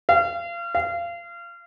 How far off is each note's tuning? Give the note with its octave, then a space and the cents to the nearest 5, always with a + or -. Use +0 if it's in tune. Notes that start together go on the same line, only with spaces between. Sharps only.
F5 -30
F5 -25